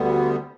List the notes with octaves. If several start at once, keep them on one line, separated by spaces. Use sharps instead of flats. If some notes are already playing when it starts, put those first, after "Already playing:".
Already playing: D2 D3 G3 B3